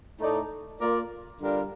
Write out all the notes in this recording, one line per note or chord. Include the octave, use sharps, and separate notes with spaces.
A2 A3 D#4 A4 D5
A#3 F4 A#4 D5
D3 G3 D4 F4 A#4